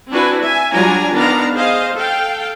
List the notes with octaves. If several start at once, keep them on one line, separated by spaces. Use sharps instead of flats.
C4 D4 E4 F#4 B4 G#5
E5 G#5
F#3 G3 D4 F4 G#5 A#5
D#3 B3 D4 F5 A#5
G#4 C5 D#5 F5
A4 F5 G5